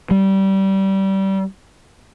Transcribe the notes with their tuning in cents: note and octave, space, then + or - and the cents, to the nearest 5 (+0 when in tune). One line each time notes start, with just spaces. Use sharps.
G3 -20